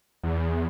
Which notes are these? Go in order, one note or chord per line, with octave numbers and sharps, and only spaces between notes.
E2